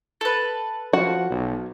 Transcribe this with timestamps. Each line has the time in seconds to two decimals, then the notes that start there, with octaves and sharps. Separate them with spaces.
0.21 A4 B4
0.93 F3 F#4 F#5
1.30 B1